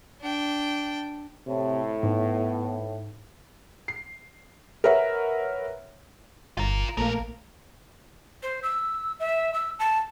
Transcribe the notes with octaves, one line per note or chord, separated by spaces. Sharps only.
D4 G5
A2 C3
G#2 B3
C7
A#4 B4 C#5 E5 F#5 A#5
G1 F4 A#4
A#1 A3 A#3 C4 A#4 F5
C5
E6
E5
E6
A5